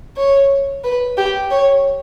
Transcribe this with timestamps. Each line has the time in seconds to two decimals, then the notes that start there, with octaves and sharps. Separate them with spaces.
0.17 C#5
0.84 B4
1.17 G4
1.51 C#5